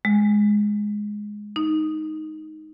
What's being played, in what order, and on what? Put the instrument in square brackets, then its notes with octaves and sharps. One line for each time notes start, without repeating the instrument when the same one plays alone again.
[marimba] G#3
D#4